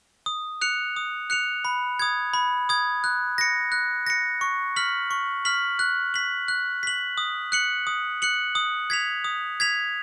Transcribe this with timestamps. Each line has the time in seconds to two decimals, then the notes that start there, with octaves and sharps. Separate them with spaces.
0.26 D#6
0.61 F#6 C#7 F7
0.96 D#6
1.30 F#6 C#7 F7
1.65 B5
1.99 D#6 G#6
2.33 B5
2.69 D#6 G#6
3.04 F#6
3.38 A#6 C#7
3.72 F#6
4.07 A#6 C#7
4.41 C#6
4.76 F6 B6 F#7
5.11 C#6
5.45 F6 B6 F#7
5.79 F#6
6.14 B6 F#7
6.48 F#6
6.83 B6 F#7
7.18 D#6
7.52 F#6 C#7 F#7
7.87 D#6
8.22 F#6 C#7 F#7
8.55 D#6
8.90 G#6 B6 F7
9.24 D#6
9.60 G#6 B6 F7